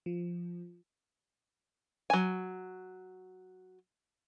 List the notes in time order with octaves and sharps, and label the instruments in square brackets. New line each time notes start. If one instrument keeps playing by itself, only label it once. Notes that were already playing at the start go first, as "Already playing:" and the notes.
[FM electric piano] F3
[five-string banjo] F#3 G#5